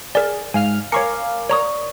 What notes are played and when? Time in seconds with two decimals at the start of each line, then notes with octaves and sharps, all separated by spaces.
0.15 G#4 A#4 D5
0.54 G#2 F5 G#5 F6
0.92 A#4 C#5 F5 G#5 C#6 D6 C#7
1.50 C#5 D5 A#5 C#6 D#6